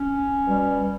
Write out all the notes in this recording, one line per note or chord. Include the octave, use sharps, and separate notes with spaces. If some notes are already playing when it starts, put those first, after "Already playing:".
Already playing: C#4
B2 G3